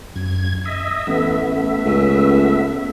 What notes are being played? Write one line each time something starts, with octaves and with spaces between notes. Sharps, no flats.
F#2 G#6
D#5 E5
A1 A3 B3 E5
C#2